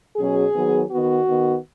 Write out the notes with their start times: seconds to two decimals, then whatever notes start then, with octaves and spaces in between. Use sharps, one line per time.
0.17 B2 F#3 C#4 G#4
0.53 D#3 F#3 B3
0.90 D#3 B3 F#4
1.27 D#3 B3